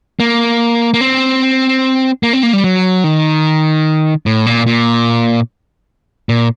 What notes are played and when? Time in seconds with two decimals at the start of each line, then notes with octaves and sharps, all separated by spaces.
0.20 A#3
0.94 A#3
1.01 C4
2.23 A#3
2.33 C4
2.43 A#3
2.53 G3
2.64 F#3
3.04 D#3
4.26 A2
4.46 A#2
4.66 A#2
6.29 A#2